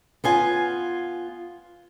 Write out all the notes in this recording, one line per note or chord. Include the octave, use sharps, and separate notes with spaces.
B3 F4 G#5